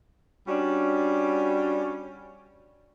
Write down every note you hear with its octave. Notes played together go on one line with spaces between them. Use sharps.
G3 C#4 D4 F#4